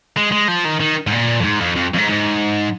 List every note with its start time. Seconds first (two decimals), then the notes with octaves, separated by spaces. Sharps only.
0.17 G#3
0.32 G#3
0.48 F3
0.65 D#3
0.80 D#3
1.07 G#2
1.12 A#2
1.40 F2
1.44 G#2
1.61 F2
1.76 F2
1.94 F2
1.98 G#2
2.09 G#2